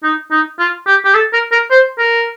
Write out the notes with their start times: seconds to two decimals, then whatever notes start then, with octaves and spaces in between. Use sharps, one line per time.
0.03 D#4
0.31 D#4
0.59 F4
0.87 G4
1.05 G4
1.14 A4
1.33 A#4
1.52 A#4
1.70 C5
1.99 A#4